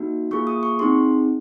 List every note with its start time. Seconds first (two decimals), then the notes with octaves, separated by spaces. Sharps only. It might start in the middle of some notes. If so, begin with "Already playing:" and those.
Already playing: A#3 D#4 F#4
0.31 A#3 F4 G#4 C#6
0.47 D#6
0.63 C#6
0.79 C4 D#4 G#4 C6